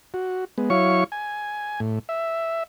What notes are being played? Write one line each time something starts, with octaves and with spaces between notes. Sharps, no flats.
F#4
G#3 B3
F#3 E4 C#5 F5 C#6
G#5
A2
E5